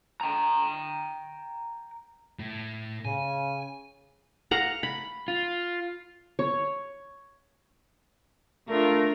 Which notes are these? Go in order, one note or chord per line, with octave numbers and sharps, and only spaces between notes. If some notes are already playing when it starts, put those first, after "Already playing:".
G5 A#5
A2
C#3 G#5
F5 F#5 A#5
B5
F4
C#5
A3 D4 F4 A#4